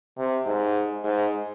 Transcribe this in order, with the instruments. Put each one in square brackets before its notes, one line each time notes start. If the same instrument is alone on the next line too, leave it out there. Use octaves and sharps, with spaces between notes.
[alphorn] C3
G#2
G#2